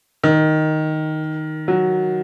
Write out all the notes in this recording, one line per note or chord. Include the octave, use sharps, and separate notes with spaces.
D#3
F#3